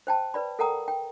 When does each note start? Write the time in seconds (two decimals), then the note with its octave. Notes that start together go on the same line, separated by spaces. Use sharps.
0.07 C5 G5 A5
0.34 B4 D5 B5
0.59 A4 A#4 F#5 G5 A#5 D#6
0.88 G5